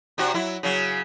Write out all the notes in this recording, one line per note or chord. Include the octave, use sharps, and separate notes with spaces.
C3 D4 F#4
F#3 E4
C#3 F#3